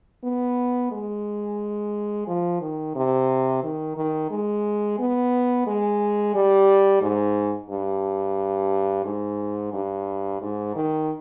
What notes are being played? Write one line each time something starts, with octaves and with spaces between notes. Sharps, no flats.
B3
G#3
F3
D#3
C3
D#3
D#3
G#3
B3
G#3
G3
G#2
G2
G#2
G2
G#2
D#3